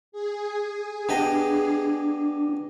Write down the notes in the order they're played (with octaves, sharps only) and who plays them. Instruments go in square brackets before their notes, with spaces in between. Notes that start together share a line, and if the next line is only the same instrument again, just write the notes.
[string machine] G#4
[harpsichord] B3 G4 D#5 [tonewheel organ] D4